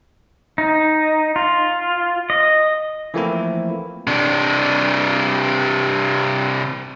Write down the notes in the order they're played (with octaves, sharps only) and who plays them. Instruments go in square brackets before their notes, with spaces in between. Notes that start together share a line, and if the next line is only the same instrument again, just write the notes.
[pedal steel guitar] D#4
F4
D#5
[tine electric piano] E3 F3 A3 A#3 C4 E4
[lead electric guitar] C3 D4